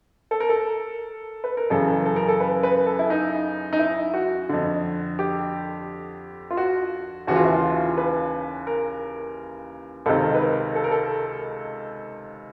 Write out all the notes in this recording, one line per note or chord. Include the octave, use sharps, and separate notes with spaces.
A4
A#4
A4
B4
A#4
F#2 C#3 E3 A4
A4
A#4
A4
B4
B4
A4
E4
D#4
D#4
E4
F#4
F2 D3
G4
F4
F#4
D#2 C#3 E3 F#4
F4
E4
F4
B4
A#4
C#2 C3 D#3 A4
B4
A#4
A4
A#4
A4